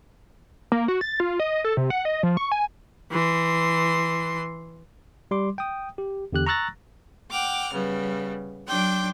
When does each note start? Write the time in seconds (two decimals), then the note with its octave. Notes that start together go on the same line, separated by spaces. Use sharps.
0.72 A#3
0.88 F#4
1.01 A6
1.20 F4
1.40 D#5
1.64 A4
1.77 C3
1.90 F#5
2.05 D#5
2.23 F3
2.37 C#6
2.52 G#5
3.11 E3 C6
5.31 G3 C6 D6
5.58 G5 D#6
5.98 G4
6.33 E2 D3 G4 F#6
6.46 A#5 C#6 E6 F#6 A6 A#6
7.30 F#5 G5 D6 F6
7.72 C#3 G3 B3
8.67 F#3 D4 G5 C6 D6